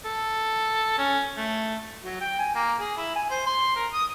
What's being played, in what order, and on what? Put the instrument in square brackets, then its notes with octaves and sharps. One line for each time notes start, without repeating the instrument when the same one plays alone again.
[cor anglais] A4
C#4
A3
[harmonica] F#3
G5
G#5
A#3
G#4
E4
G#5
C5
C6
A#4
D#6